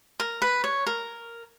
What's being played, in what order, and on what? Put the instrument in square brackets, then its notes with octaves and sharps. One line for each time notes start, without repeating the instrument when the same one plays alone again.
[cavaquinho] A#4
B4
C#5
A#4